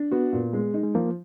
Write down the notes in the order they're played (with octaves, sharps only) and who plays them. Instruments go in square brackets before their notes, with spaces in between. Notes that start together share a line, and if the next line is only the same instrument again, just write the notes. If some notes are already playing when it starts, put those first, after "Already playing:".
Already playing: [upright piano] D4
[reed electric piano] B3 [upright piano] F#4
[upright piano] A#2
G#3
D#4
[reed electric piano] G#3
[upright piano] F3 [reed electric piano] A#3